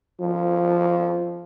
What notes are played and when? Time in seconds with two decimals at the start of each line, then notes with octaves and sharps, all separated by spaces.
0.20 F3